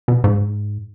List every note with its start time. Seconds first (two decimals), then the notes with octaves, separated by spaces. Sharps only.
0.08 B2
0.24 G#2